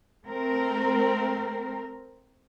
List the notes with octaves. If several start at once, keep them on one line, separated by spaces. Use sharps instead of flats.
A3 C4 A#4